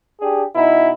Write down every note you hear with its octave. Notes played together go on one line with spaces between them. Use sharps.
D4 G4 G#4
B2 D#4 E4